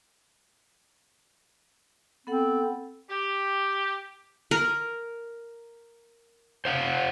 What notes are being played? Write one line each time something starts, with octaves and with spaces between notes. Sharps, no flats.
B3 C4 A4 F#5
G4
A#4
C5 F5 F#5